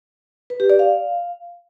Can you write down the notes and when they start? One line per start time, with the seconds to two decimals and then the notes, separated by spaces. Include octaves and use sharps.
0.50 B4
0.60 G4
0.70 D5
0.79 F5